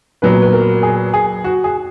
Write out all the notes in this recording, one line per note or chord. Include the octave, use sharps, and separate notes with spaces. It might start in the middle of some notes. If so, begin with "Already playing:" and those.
A#2 F#3 B3 B4
B4
A#4
G#4
G#4
F#4
G#4